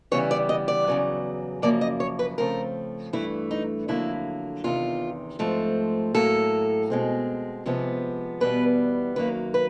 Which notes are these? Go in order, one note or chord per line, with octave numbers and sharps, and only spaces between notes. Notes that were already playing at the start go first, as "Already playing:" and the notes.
C#3 E3 G3 B3 C#5
D5
D#5
D5
E2 C#3 F#3
F#2 C#3 F3 A#3 D5
D#5
C#5
B4
C#3 F3 A3 C4 A#4
G2 E3 A3 E4
D#4
F2 D3 F#3 A#3 E4
E2 C3 D#3 F4
G#2 F3 A3 C4
A2 F#3 A#3 A4
B2 G#3 C4
C3 F3 G#3 B3
E2 B2 G3 B3 B4
F#2 D#3 F#3 A#3 B4
B4